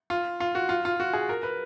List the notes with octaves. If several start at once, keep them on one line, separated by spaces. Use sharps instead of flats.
F4
F4
F#4
F4
F4
F#4
G#4
A#4
B4